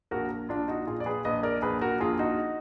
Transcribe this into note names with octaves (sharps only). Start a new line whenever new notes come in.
A#1 F#4 A#4
A#1 D4 F4
D#4 F#4
A#2 F4 G#4
D5
G#4 B4
A#1 B4 D#5
A#4 D5
A#1 G#4 B4
F#4 A#4
A#1 F4 G#4
D#4 F#4